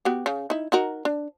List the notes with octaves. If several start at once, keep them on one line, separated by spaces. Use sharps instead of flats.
B3 F#4 G4
C#3
D#4 E4
D#4 F#4 A#4
D4